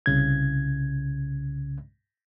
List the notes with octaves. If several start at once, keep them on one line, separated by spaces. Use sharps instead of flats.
C2 C#3 G#6